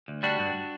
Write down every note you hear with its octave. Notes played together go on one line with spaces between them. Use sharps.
D2
G3 D4 F#4
G2